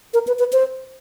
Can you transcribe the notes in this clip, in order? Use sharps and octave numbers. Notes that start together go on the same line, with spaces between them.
A#4
B4
B4
C5